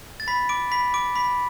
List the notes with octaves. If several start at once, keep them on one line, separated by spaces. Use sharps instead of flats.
A6
B5 B6
D6 D7
B5 B6
D6 D7
B5 B6